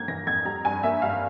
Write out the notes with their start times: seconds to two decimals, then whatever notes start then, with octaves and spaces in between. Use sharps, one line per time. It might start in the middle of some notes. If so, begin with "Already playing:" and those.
Already playing: F2 G3 A#3 G6 G#6
0.08 E3 A#6
0.27 F2 G#6
0.45 G3 A#5
0.65 G2 G#5
0.83 A#3 E5
1.02 G2 F5